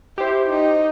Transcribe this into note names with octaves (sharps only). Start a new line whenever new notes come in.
E4 G4 C5
D#4